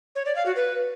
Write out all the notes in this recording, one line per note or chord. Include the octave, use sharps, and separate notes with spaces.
C#5
D5
F5
F#4
B4